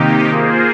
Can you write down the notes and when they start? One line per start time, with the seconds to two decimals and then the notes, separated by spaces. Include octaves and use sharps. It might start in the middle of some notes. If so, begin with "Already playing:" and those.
Already playing: C3 D#3 A#3 D#4 G4
0.30 A#3 F4 G#4 C5